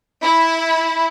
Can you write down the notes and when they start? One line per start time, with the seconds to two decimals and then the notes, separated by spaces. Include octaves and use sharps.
0.24 E4